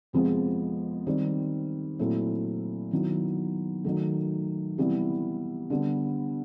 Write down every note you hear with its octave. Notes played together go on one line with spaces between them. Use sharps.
F2 C3 F3 G#3 B3
D#3 G3 C4
A#2 F#3 A3 C4 E4
D#3 F#3 B3 E4
D#3 F#3 A3
C3 E3 G3 B3 E4
D3 G3 B3